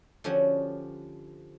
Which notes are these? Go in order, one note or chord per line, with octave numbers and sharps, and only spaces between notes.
D3 F3 C#4 F#4 G4 C#5